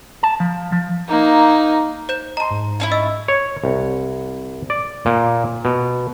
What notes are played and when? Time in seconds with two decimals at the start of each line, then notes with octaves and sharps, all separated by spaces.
0.23 A5
0.40 F3
0.72 F3
1.09 A#3 D#4
2.09 C5 G6 E7
2.37 D#5 A5 A#5 C6
2.51 G#2
2.80 C#4 D4 E4
2.92 D#5 E6
3.28 C#5
3.64 C2
4.70 D5
5.06 A#2
5.65 B2